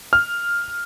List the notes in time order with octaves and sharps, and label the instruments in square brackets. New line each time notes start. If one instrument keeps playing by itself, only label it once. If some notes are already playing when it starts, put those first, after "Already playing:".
[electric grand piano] F6